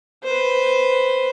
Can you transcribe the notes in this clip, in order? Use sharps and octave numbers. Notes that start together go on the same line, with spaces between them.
B4 C5